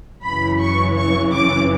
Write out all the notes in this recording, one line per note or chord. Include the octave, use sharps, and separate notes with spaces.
F#2 C#3 E3 B5
C#6
C#6
D6